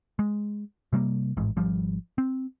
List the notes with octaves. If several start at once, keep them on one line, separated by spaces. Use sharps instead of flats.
G#3
C3 G3 A3 A#3
A1 G#2
G#1 F3 G3
C4